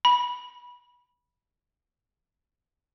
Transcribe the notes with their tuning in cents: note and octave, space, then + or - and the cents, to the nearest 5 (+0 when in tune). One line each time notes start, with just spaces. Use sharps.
B5 -20